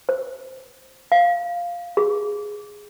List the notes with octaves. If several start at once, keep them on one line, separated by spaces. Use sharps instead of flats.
C5
F5
G#4